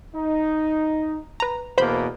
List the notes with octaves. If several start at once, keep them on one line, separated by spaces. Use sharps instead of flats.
D#4
B4 A#5
E2 B2 A#3 C5 B5 G6